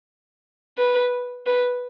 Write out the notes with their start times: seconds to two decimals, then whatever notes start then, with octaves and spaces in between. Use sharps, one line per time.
0.78 B4
1.46 B4